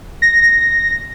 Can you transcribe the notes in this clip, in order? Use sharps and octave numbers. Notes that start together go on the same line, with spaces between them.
A#6